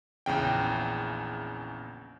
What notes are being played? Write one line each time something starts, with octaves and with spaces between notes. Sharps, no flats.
A#1 E2 C#3 G5